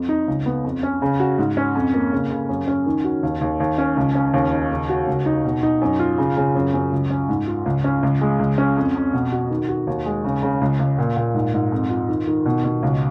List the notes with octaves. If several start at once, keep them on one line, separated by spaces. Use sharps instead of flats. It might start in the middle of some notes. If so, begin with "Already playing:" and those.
Already playing: F2
D#4
C#2
B3
F2
C#4
C#3
F#4
G#2
C#4
F2
A#3
C#3
C#3
F#2
C#4
D#3
F#4
D#2
D#2
D#2
C#4
C#2
C#4
D#2
D#4
C#3
F#4
C#2
D#4
B2
D#4
F#2
F4
C#3
C#3
F#2
F#2
C#2
C#4
G#2
F4
C#2
C#4
C#2
G#3
C#2
C#4
F2
F2
B2
F#4
D#3
F#4
D#2
G#3
C#3
C#3
C#2
C#2
A#2
A#2
G#2
G#2
F2
F4
D#3
D#3
B2
B2
C#2